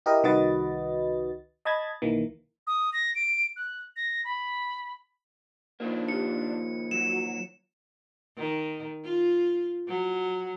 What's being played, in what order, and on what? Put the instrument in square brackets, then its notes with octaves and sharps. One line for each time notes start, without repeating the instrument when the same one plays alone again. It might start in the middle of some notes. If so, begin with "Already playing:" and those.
[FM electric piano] E4 G4 A#4 D#5
C2 D#3 F#4 B4 D#5 A6
D#5 A5 B5 G#6 A6
B1 D#3 E3 A#3
[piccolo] D#6
A#6
D7
F#6
A#6
B5
[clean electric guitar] D#3 F3 A#3 [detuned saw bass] D4
[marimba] F4 G4 [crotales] C#7
[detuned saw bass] F#3 [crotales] E7
[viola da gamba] D#3
F4
F#3